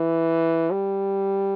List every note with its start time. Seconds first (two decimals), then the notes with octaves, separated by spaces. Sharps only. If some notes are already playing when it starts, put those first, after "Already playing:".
Already playing: E3
0.72 G3